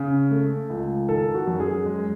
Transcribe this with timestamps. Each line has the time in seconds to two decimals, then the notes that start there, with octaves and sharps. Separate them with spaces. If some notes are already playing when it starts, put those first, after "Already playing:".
Already playing: C#3
0.31 A3
0.70 C#2
1.08 D#3 A4
1.34 F#4
1.47 F#2
1.60 G#4
1.86 G#3